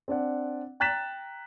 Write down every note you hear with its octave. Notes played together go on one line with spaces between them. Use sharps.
C4 D4 D5 F#5
G5 A#5 F#6 A6 B6 E7